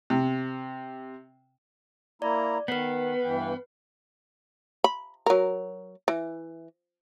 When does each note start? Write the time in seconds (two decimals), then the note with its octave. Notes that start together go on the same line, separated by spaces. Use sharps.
0.10 C3
2.22 A#3 E4 D5 A#5
2.68 D#3 B3 B4 C7
3.24 G2 E3 G5
4.84 B5
5.26 F#3 A#4
6.08 E3